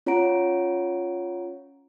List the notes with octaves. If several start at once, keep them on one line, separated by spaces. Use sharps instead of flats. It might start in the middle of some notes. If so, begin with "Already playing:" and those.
C#4 F4 C#5 F#5 A#5 D7